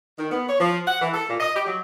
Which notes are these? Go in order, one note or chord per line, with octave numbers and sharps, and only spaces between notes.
D#3
B3
C#5
F3
F#5
E3
A4
A#2
D#5
G4
F#3